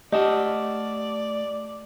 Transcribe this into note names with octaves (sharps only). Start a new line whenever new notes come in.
A3 G4 D5 D#5 F#5 A5